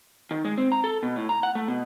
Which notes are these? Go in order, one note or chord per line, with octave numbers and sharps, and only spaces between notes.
D#3
G#3
C4
A#5
A4
B2
A2
A#5
F#5
A3
B2